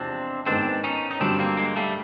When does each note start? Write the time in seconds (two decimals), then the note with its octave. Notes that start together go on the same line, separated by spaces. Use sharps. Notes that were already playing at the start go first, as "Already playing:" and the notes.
Already playing: E2 C3 F3 G#3 C4 D4
0.47 G#2 D#3 G#3 B3 C4 D4
0.84 C#4 D#4
1.11 D#4
1.21 G2 D3 F#3 C4 D4
1.39 A#3 C4
1.57 G#3 A#3
1.76 G3 A3